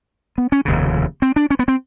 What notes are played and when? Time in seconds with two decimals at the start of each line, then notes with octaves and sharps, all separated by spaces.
0.38 B3
0.52 C#4
0.65 F1 D#2 C#3
1.22 C4
1.36 D4
1.50 C#4
1.59 B3
1.68 C4